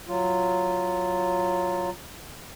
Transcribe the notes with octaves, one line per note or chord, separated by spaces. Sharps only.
F#3 F4